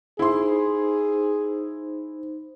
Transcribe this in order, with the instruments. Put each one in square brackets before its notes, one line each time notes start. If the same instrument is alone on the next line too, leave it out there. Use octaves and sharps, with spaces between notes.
[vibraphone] D#4 C5 [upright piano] E4 C6 [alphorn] G#4